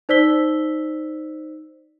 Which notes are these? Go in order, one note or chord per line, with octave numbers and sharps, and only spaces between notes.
D#4 C5 D5 E6 B6 G7